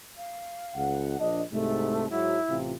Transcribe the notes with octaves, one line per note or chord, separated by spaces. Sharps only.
F5
C#2 F#5
A#1 D4 D#5
C2 G#2 C3 A3
G#2 F#3 E4
A1 C3 F4